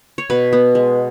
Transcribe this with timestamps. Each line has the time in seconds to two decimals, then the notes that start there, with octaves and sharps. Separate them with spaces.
0.18 C#5
0.30 B2 B4
0.53 B3
0.75 G#3